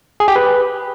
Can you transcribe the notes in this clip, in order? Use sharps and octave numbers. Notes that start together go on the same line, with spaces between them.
G#4
G4
B4